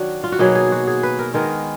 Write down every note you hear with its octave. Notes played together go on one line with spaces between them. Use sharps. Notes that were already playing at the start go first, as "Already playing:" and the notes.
Already playing: D#3 F#3 D4 F#4
F4
F#4
B2 F#3 A#3 D#4 G#4
G#4
F#4
G#4
B4
A#4
D#3 G#3 B3 A#4